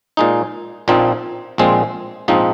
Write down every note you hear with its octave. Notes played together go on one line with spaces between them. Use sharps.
A#2 G#3 D#4
A#1 A#2 F3 C4 D#4
A#1 A#2 G#3 C4
A#1 G#2 F3 C4 D#4